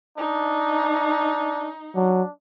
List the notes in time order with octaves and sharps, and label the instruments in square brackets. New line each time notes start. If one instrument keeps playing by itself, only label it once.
[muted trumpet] D4 [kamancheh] D#4
[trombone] F#3 [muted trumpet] D4